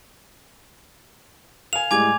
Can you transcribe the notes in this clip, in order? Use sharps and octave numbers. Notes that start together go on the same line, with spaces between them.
F5 G#5 F7
A2 G3 G#3 G#5 D6 G#6